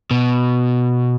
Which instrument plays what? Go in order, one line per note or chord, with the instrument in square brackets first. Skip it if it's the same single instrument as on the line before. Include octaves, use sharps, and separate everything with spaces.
[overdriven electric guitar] B2